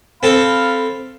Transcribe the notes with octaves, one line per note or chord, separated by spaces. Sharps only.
C4 A4 F5 B5